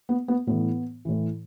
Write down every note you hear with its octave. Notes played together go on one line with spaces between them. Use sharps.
B3
B3
A2 E3 B3
A2 E3